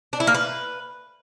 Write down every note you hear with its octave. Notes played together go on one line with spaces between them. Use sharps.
D4
E4
A#3
B4